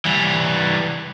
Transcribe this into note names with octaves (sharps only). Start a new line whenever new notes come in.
E3 G3